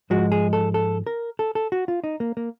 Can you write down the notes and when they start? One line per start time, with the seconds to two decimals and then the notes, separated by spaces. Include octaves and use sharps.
0.10 G#2 F3 G#3 F#4
0.32 G#4
0.53 A4
0.74 A4
1.07 A#4
1.39 A4
1.55 A4
1.72 F#4
1.88 F4
2.04 D#4
2.20 A#3
2.37 A#3